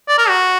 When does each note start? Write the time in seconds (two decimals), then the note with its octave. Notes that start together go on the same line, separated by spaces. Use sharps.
0.08 D5
0.18 A#4
0.29 F#4